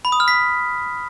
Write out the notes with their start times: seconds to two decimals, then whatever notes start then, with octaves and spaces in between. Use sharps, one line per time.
0.05 B5
0.12 D#6
0.20 F6
0.28 B6